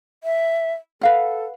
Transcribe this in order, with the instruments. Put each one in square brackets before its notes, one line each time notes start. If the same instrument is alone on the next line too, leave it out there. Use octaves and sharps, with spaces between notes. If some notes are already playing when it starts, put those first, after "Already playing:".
[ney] E5
[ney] A4 [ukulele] B4 F5 F#5